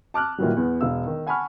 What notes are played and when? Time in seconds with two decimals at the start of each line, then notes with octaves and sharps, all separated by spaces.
0.14 A5 D6 F6 F#6
0.38 A#2 D#3 E3 F#3 G3
0.56 E2 B3
0.81 E1 F5 E6
1.06 D#3
1.27 F#5 G#5 A5 B5 C#6 F6